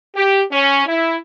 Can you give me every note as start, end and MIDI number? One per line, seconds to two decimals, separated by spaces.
0.15 0.43 67
0.52 0.84 61
0.86 1.16 64